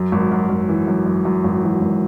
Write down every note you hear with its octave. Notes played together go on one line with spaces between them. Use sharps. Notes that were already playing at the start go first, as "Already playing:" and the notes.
Already playing: F#2
G#1
F#2
F#2
E3
F#2
F#2
F#2
G#1
E3
G#1